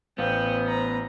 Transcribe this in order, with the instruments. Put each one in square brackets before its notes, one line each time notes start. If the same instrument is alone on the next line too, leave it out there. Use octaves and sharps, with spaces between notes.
[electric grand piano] A1 F5 [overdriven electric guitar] B3 [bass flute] C5 [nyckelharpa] G5
[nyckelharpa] A#5